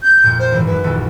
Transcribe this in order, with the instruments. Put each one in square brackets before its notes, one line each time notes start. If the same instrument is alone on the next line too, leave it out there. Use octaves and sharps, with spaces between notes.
[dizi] G6
[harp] F2 A#2
[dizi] C5
[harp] G#1 E3
[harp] F#2 G#6 [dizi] B4
[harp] D#1 A#1 A4